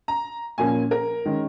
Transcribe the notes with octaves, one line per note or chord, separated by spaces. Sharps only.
A#5
A#2 F3 A#3 C#4 G#5
A#4
D#3 G#3 C#4